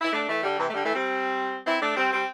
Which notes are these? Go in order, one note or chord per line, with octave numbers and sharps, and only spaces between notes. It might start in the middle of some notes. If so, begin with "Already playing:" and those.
E4
A3 D4
E3 A3
D3 G3
C3 E3
A3
D3 G3
E3 A3
G3 C4
C4 E4
A3 D4
G3 C4
G3 C4